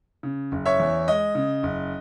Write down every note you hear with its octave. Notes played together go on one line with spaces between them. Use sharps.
C#3
F#1
C#5 E5
E2
G#3 D#5
C#3
F#1